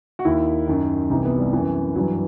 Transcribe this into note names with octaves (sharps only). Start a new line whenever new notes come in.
F#4
D#2 D#3 E4
F#2 D#3
C2 C3 E3 D#4
B3
G3
F#2 E3
G2 E3 F#3